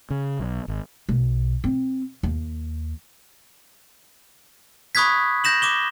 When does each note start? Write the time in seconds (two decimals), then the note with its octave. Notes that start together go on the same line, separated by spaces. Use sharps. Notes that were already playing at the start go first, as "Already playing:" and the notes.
0.10 C#3
0.39 B1
0.68 G#1
1.09 B1
1.64 C4
2.23 D#2
4.95 B5 C#6 D#6 F#6 G#6 B6
5.44 G6 A#6 E7 F#7
5.62 D6 E7 G7